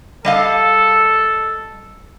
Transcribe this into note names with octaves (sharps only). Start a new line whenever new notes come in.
G3 A4 D#5 F5